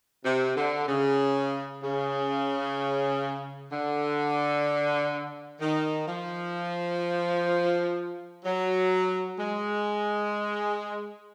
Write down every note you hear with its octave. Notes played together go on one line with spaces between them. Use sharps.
C3
D3
C#3
C#3
D3
D#3
F3
F#3
G#3